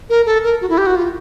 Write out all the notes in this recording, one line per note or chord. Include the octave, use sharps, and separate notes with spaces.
A#4
A4
A#4
F#4
E4
G4
F#4
F4